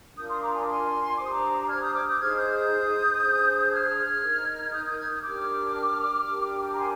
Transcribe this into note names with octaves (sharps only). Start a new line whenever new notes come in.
D4 F4 A#4 D#6 G6
C6 D#6
A#5 D6
G#5 C6
G#5 C6
D4 G4 C5 D6
D#6
A#5 D6
F6 G#6
D#6 G6
D6 F6
D#6 G6
D#4 G#4 C5 F6 G#6
D#6 G6
D#6 G6
D4 G#4 C5
F6 G#6
D#4 A#4
D#6 G6
D#6 G6
F6 G#6
D#6 G6
D4 G4 A#4 D6 F6
D4 G4 A#4
A#5
G#5 C6